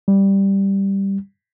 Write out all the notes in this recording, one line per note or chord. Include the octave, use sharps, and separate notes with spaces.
G3